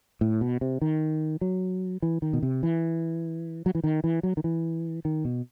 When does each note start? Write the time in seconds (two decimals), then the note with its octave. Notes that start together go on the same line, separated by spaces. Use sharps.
0.21 A2
0.41 B2
0.61 C3
0.82 D#3
1.41 F#3
2.02 E3
2.22 D#3
2.33 B2
2.43 C3
2.63 E3
3.66 F#3
3.75 E3
3.84 D#3
4.04 E3
4.23 F#3
4.37 D#3
4.44 E3
5.05 D#3
5.25 B2